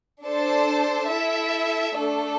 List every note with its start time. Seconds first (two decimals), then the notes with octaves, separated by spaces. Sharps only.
0.25 D4 A4 C5 A5
1.11 E4 A4 E5
1.97 A3 D4 A4